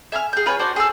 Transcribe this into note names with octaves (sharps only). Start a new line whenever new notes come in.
E5 G#5 B5 F6
G#4 G6
F4 B4 C#5 G#5
D4 F#4 C5 D5
G#4 A4 E6